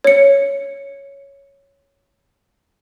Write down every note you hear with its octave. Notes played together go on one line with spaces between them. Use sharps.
C#5 C#7